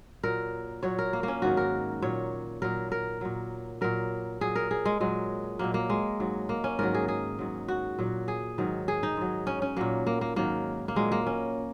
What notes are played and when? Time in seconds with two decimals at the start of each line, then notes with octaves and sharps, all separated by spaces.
0.23 A#2 F#3 A#4
0.83 A#2 F#3 C#5
0.99 A#4
1.13 A#3
1.23 A#3 C#4
1.42 G#2 D#3 F#3 F#4
1.57 A#4
2.02 A#2 F#3 C#5
2.62 A#2 F#3 A#4
2.92 A#4
3.21 A#2 F#3
3.81 A#2 F#3 A#4
4.41 A#2 F#3 G#4
4.55 A#4
4.71 G#4
4.85 G#3
5.00 A#2 F#3 G#3
5.59 A#2 F#3 A#3
5.74 A#3
5.90 G#3
6.20 G#2 F#3
6.49 A#3
6.64 C#4
6.79 G#2 D#3 F#3 A#4
6.94 G#4
7.08 G#4
7.39 G#2 F#3
7.68 F#4
7.99 A#2 F#3
8.28 G#4
8.58 G#2 D#3 F#3
8.88 G#4
9.03 D#4
9.17 G#2 F#3
9.47 C#4
9.62 C#4
9.77 A#2 F#3 A#3
10.07 A#3
10.21 A#3
10.36 G#2 D#3 F#3 A#3
10.88 A#3
10.96 A#2 F#3 G#3
11.12 A#3
11.27 C#4